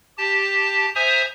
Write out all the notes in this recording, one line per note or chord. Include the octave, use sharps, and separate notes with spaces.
G4 A5
C5 E5 G#5 A#5 D#6